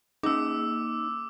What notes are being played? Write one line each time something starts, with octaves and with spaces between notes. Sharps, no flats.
A#3 C#4 D#4 G#4 D6 E6